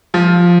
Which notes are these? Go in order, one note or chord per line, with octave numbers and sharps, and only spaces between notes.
F3